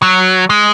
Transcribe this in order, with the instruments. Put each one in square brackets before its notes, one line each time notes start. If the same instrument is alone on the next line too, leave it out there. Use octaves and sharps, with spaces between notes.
[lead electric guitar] F#3
G#3